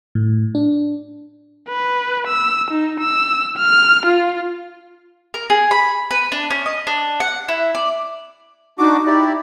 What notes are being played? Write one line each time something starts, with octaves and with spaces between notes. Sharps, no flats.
A2
D4
B4
E6
D#4
E6
F6
F4
A#4
G#4
B5
B4
D4
C#4
D#5
D4
F#5
E4
D5
D4 D#4 F#4 D6
E4 G4 D5